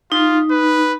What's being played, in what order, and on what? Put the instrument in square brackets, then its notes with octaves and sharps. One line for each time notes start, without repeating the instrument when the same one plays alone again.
[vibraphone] D#4 [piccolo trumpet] F4
[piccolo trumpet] B4